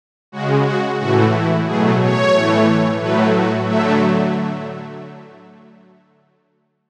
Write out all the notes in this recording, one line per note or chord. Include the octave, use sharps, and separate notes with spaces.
C#3 G#3 F#4
F#4
A2 E3 A3 F#4
E4
B2 F#3 A3 G#4
C#5
A2 E3 A3
A2 F#3 A3 B4
F#4
D3 F#3 A3 E5